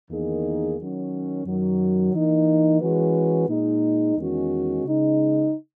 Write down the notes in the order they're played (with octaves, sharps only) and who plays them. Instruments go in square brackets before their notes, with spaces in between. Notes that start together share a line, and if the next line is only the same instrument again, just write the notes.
[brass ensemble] E2 D#3 A#3 D#4 G#4
D#3 F#3 C#4
F#2 D#3 F#3
E3 A#3 D#4
E3 G#3 C#4 F#4 B4
A#2 G#3 D#4
E2 D#3 G#3 C#4 F#4
C#3 G#3 D#4